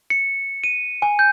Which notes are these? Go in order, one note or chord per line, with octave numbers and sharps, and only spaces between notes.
C#7
D#7
G#5
G6